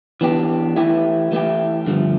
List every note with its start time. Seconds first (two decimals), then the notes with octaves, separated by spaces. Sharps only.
0.21 E3 B3 D4 G4
0.76 E3 A3 E4 G4
1.32 E3 A3 E4 G4
1.87 G2 D3 F3 A3